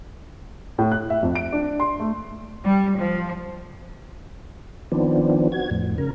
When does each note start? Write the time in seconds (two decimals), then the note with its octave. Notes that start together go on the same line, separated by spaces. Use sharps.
0.78 A2
0.92 F#6
1.10 E5
1.23 F2
1.35 D7
1.52 D4
1.80 C6
2.00 A3
2.64 G3
2.97 F3
4.92 D#3 F3 B3 C4 D4
5.52 F#4 G#6
5.71 F2 A2
5.98 C#3 A#4